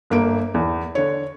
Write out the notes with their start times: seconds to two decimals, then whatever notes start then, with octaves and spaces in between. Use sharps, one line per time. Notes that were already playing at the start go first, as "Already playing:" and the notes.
0.10 G1 A#3 D7
0.54 E2
0.95 D3 C#5